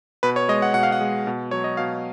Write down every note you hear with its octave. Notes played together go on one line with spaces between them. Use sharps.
B2 B4
C#5
G#3 D#5
F#5
B2 F#5
F5
F#5
G#3
B2
F#3 C#5
D#5
B2 F5